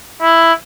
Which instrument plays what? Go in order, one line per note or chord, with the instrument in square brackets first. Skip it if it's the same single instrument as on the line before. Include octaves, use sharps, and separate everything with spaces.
[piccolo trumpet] E4